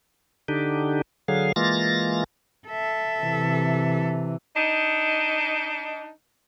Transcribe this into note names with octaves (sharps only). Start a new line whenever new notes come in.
D3 D4 D#4 G4
D3 F#3 G#4 F5
E3 G#3 A#3 F4 A6 A#6
A4 E5
C3 E3
D4 D#4